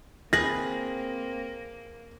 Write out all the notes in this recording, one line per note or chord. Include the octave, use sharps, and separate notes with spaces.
A#3 C4 G#4 B4 A#6